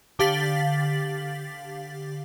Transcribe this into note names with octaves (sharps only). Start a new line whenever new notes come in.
D3 G4 F5 A6 B6 F#7